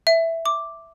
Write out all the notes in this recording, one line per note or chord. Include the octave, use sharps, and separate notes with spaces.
E5
D6